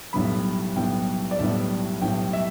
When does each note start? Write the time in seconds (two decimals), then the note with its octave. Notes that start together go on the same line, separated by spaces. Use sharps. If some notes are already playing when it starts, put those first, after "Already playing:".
0.13 B1 A2 G3 B3 B5
0.76 B1 A2 G3 B3 G5
1.31 D5
1.39 B1 A2 G3 B3 E5
2.02 B1 A2 G3 B3 G5
2.33 E5